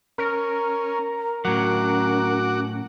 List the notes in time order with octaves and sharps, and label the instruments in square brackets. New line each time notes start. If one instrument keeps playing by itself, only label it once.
[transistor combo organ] C#4 [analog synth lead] A#4
[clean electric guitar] A2 F#3 [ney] C#4 [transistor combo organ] F#4 F#5 D6